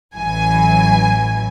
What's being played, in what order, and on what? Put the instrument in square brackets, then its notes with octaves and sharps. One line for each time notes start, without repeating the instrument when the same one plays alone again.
[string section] A1 E3 F#3 G#5